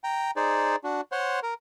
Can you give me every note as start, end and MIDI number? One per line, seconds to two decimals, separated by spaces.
0.04 0.31 79
0.04 0.31 82
0.36 0.76 63
0.36 0.76 68
0.36 0.76 72
0.36 0.76 74
0.84 1.01 62
0.84 1.01 66
1.12 1.40 72
1.12 1.40 73
1.12 1.40 78
1.12 1.40 84
1.43 1.54 70